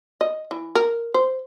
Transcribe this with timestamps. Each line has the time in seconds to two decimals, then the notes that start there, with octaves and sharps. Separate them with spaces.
0.21 D#5
0.51 E3
0.75 A#4
1.14 C5